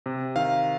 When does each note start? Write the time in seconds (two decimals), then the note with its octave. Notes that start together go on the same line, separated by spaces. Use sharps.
0.06 C3
0.36 D#3 F5